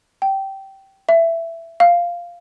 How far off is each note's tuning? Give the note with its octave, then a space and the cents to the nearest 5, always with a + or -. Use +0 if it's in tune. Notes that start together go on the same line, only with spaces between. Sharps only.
G5 -15
E5 +15
F5 -5